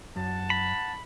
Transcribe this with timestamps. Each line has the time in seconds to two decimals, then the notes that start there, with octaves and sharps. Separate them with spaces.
0.16 F#2 F#5 A5
0.50 B5